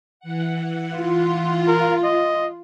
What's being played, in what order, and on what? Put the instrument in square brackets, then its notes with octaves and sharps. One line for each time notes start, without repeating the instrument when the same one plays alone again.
[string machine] E3 F#5
[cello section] F4
[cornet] A#4
D#5